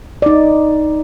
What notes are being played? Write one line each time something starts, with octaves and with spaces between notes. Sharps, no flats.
D#4 D5